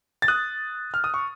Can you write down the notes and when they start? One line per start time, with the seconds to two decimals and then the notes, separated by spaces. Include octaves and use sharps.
0.22 A6
0.28 D#6 F#6
0.94 F6
1.04 D#6
1.14 C#6